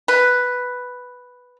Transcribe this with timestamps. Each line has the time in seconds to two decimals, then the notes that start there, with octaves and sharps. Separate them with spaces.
0.08 B4